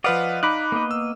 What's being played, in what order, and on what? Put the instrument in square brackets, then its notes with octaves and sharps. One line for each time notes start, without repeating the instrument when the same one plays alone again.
[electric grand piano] F3 B4 F#5 [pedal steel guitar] D5 D#5 F5
[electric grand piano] D#4 [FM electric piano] B5 D6 F#6
[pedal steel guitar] A#3 B3 D#5
[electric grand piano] E6